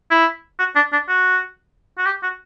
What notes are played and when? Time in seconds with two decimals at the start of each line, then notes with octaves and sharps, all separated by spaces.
0.11 E4
0.59 F#4
0.76 D4
0.92 D4
1.09 F#4
1.98 F#4
2.06 G4
2.23 F#4